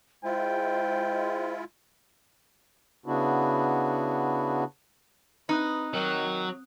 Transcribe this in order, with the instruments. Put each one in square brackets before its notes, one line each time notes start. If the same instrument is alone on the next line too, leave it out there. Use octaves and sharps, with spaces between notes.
[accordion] G#3 E4 F4 [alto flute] C5 [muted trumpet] G5
[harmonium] C#3 B3 D4 E4 F#4
[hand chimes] C4 D#6 F#6 [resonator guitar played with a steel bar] D#4 [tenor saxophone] B4
[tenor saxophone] D#3 [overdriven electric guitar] F#3